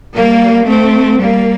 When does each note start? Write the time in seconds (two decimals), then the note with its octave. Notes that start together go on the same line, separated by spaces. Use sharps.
0.14 G3 A#3
0.66 A3 C4
1.18 G3 A#3